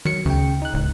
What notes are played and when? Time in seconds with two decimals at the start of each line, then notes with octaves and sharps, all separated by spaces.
0.05 D#3 F#3 C#7
0.25 D2 C#3 G5
0.62 D#4 F#6
0.74 D1 C#2